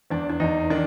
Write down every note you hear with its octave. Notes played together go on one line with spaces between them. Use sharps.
E2 D4
D4
E2 D#4
D#3 D4